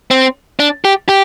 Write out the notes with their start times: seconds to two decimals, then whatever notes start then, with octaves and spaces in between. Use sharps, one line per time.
0.11 C4
0.59 D4
0.85 G4
1.09 G4